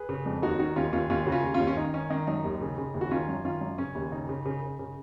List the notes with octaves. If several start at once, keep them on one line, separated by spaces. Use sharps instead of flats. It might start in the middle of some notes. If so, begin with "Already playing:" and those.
Already playing: G#4 B4
C#3
F2
D#2 D#4 F#4
D#3 D#4 F#4
D#2 C#4 F4
D#2 C#4 F4
D#2 C#4 F4
C#3 F#4
C#4 F4
D#2
C#4 F4
D#2
C#4
D#3 D#4
D#3 C#4
D#3 D#4
F#2 D#4
D#2
C#3
C#3
D#2
F#4
D#3 C#4 F4
F#2
D#3 C#4 F4
F#2
C#3 C#4
D#2
C#3 D#4
C#3
C#3
C#3
C#3